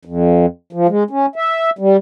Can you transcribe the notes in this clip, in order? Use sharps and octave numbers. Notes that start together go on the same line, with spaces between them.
F2
F3
G#3
C#4
E5
G3